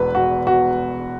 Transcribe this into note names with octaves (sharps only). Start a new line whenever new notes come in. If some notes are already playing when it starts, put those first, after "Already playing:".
Already playing: E1 E2 B4
F#4
F#4